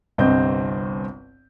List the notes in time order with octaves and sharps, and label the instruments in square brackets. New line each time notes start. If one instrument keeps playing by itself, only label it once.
[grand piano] G1 C2 G2 C4 D#5 G6